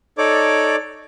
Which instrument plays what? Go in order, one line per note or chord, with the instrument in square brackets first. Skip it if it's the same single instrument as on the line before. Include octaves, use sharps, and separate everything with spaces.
[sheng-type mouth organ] D#4 A4 C#5 D5 D6